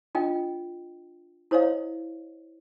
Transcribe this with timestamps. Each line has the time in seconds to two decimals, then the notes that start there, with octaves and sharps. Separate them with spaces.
0.15 D4 F4 D#5 G5
1.51 E4 C5 C#5 D#5 F5